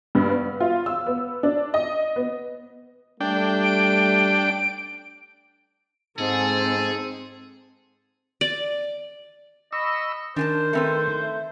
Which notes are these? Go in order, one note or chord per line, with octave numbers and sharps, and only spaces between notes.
G2
B3
F4
E6
B3
D4
D#5
B3
G3 A3 D4 G5
D7
G#2 C4 G#4 A4
D5
D#5 B5 C#6 E6
D#3 D4 A#4 C5 G#5 A5
A3 C4 B4
E5